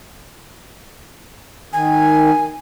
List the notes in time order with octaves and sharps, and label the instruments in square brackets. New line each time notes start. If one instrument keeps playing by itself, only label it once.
[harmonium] D#3 [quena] G#5